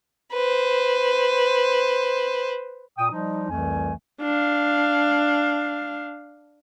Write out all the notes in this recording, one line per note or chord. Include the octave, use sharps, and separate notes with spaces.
B4 C5
A#2 G5 D#6
F3 G3 D#4
C2 F2 E3 A3 G#5
D4 F5